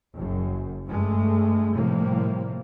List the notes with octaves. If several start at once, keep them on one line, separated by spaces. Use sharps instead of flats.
F#1 F#2
G2 G#3 A3
A2 C3 F3 G3 A#3